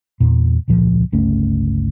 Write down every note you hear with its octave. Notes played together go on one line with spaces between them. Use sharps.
E2 A#2
E1 C#2 A#2 F3
G1 C#2 A3 C#4